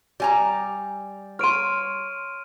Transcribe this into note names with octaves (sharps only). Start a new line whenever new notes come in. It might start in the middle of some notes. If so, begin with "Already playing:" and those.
G3 G#5 A#5
C#5 C6 F6 D7 D#7